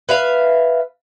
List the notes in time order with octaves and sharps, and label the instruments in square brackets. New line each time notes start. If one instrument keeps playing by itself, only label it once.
[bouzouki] B4 E5 F5